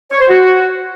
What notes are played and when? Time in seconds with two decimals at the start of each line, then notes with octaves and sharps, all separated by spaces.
0.12 C#5
0.21 C5
0.30 F#4